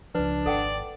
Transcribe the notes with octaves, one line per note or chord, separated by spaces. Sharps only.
C#2 F3 D4 B4
G#1 A4 D5 F#5 G5